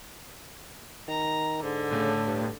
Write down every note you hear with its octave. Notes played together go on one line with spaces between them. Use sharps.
D#3 A#5
G#2 D3
A2 C#3
G2